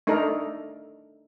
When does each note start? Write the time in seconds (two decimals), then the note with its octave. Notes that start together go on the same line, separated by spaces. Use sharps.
0.07 A3 D4 D#4 A4 A#4